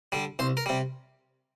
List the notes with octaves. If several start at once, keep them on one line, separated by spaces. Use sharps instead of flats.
D3 G3
C2 C5
A#4
C3 G3